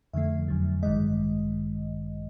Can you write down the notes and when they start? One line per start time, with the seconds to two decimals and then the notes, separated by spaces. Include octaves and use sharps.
0.13 F2 D3 F3 A3 E5
0.48 F2 D3 F#3
0.83 A1 G2 D#3 G#3 D#5